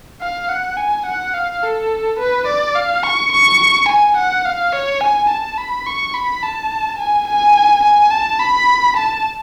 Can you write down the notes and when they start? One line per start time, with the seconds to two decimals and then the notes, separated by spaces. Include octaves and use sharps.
0.21 F5
0.49 F#5
0.77 G#5
1.06 F#5
1.34 F5
1.63 A4
2.19 B4
2.47 D5
2.76 F5
3.04 C#6
3.32 C#6
3.88 G#5
4.16 F#5
4.45 F5
4.73 C#5
5.01 G#5
5.29 A5
5.58 B5
5.86 C#6
6.14 B5
6.42 A5
6.99 G#5
7.27 G#5
7.84 G#5
8.11 A5
8.39 B5
8.96 A5